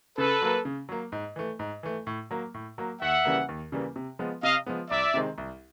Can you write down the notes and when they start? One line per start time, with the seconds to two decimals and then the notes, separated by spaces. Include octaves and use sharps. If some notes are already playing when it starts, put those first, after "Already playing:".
0.18 C#3 A4 B4
0.42 F#3 A#3
0.65 C#3
0.89 F#3 A#3
1.12 G#2
1.36 E3 A3
1.59 G#2
1.83 E3 A3
2.07 A2
2.31 F#3 A#3
2.54 A2
2.78 F#3 A#3
3.01 D#2 E5 F#5
3.25 C#3 E3 G3 A#3
3.49 D#2
3.72 C#3 E3 G3 A#3
3.96 C3
4.19 F3 G#3 B3
4.43 C3 D#5 F5
4.66 F3 G#3 B3
4.90 C2 D5 E5
5.14 C3 D#3 G#3 C4
5.38 C2